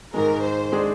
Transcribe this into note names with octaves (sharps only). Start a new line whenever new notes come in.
G#2 D#3 G#3 A#4
C5
D#3 G#3 D4 G#4